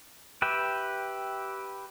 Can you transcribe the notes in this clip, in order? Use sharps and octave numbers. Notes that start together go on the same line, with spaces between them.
G4 B4 E5 G5